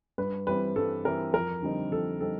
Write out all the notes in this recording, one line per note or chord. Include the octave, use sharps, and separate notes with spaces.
G2 B4
E3 G3 C4 B4
G2 A4
E3 G3 C4 A#4
F2 A#4
D3 G3 C4 D#4
F2 A4
D3 G3 C4 D#4 A4